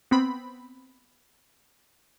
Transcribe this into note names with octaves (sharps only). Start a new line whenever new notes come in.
B3 C4 B5